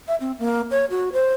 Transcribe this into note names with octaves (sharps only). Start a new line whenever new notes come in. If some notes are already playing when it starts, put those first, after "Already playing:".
E5
C4
A#3
C#5
F#4
C5